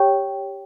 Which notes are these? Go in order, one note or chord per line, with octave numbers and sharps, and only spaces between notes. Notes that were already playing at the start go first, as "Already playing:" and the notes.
Already playing: G4 C#5 G5